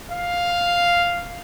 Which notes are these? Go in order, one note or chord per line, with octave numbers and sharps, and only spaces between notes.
F5